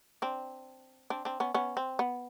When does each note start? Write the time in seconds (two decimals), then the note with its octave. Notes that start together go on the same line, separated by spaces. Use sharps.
0.22 C4 D4
1.10 C4 D4
1.25 C4 D4
1.40 B3 C#4
1.54 B3 C#4
1.77 C4
1.99 B3